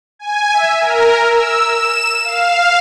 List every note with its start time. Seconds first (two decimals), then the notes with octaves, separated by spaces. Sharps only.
0.19 G#5
0.53 E5
0.81 A#4
1.29 E6
1.64 E7
2.24 F5